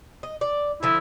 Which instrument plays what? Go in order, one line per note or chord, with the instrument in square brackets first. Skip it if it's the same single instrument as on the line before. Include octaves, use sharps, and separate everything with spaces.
[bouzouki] D#5
D5
[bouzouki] D3 F3 [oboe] E4